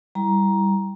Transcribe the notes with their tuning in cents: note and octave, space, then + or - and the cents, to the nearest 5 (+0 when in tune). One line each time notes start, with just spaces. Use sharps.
G3 +0 E4 -5 A#5 +10